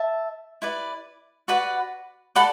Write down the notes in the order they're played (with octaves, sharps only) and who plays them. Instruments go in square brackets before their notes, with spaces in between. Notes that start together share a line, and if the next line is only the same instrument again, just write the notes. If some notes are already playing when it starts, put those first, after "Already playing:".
Already playing: [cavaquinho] E5 A5
E4 B4 D5
F#4 B4 D5 F#5 B5
A4 D5 F#5 B5